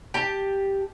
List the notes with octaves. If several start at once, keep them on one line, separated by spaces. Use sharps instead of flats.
G4 A5